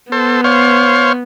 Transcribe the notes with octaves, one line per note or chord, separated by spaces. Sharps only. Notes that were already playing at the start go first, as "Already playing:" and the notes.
B3 A4 C5
C5 C#5 F5